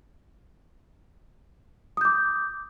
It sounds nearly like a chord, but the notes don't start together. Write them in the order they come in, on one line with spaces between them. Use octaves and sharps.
D#6 G6 D6